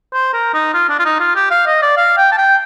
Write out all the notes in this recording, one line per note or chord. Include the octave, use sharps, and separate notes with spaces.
C5
A#4
D#4
F4
D4
F4
D#4
F4
G4
F5
D#5
D5
F5
G5
A5
G5